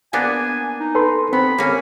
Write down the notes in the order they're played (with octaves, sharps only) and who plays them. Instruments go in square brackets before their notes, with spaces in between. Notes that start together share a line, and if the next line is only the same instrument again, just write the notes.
[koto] A#3 B3 D4 [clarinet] G#5
[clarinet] D#4
[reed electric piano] A4 B4 C6
[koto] B3 [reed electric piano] C4 [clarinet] B5
[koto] A#3 C#4